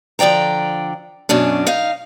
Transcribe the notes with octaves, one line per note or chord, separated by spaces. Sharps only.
D3 F3 D5 G5 A#5
F#2 B2 C#4 D4
D#4 F5